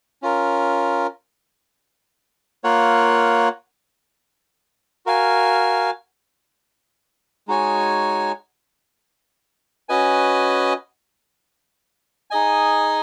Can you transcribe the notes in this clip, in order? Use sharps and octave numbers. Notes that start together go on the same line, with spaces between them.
C#4 F4 A#4
A#3 F4 A#4 C#5 F#5
F#4 A#4 F5 G#5
G#3 D#4 F#4 C#5 G#5
C#4 F#4 B4 D#5 G#5
D#4 G#4 D#5 G#5